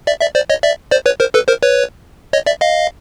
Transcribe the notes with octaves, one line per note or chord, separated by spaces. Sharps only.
D5 E5
D5 E5
C5 D5
C#5 D#5
D5 E5
C5 D5
B4 C#5
A#4 C5
A4 B4
A#4 C5
B4 C#5
C#5 D#5
D5 E5
D#5 F5